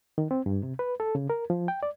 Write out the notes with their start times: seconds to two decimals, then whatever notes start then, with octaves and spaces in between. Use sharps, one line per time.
0.18 D#3
0.31 C4
0.46 G2
0.63 C3
0.79 B4
1.00 A4
1.15 C#3
1.30 A#4
1.50 F3
1.68 G5
1.83 D5